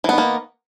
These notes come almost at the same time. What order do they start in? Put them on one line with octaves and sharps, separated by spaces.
E3 B3 D#3 A#3